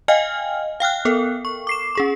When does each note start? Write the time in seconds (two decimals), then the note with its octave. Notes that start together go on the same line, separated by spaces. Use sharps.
0.08 D#5 F5 G5 G#5 F6
0.80 F5 G5 F6 F#6
1.05 B3 A4 A#4
1.45 C#6
1.67 D6 C7 E7
1.95 C#4 G#4 C#6